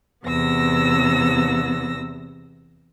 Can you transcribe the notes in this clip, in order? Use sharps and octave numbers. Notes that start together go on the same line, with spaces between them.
E2 C3 B3 E6 A#6